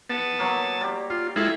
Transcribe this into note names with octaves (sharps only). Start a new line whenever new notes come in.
B3 A5
F#3 A#3
G3 G4
F4
G#3 E4 F4 A4